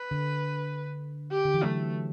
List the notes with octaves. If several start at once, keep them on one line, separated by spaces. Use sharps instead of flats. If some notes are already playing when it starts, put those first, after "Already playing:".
Already playing: B4
D3
G4
D3
E3
F#3 A3